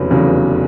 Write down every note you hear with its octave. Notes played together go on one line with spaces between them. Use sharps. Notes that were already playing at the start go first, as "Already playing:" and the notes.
Already playing: F1 E2 C#3 F#3 B4
F1 E2 C#3 F#3